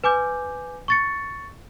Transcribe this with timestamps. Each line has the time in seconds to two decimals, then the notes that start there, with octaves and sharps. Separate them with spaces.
0.04 B4 G#5 D6 G6
0.88 C#6 A6 C#7